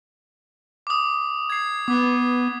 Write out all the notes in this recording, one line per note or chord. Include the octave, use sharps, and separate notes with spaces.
D6 D#6
G#6 C7
B3 D6